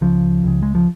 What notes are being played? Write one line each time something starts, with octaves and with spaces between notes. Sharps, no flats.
C#2 C#3 F3
C#2 C#3
G#3
F3